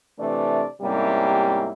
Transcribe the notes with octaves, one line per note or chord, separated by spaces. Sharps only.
C3 E3 A3 D4 D5
G#2 C3 G3 A#3 C#4 E4